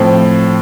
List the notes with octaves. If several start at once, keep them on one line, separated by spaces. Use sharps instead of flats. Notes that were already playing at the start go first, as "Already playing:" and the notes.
Already playing: A2 F3 C4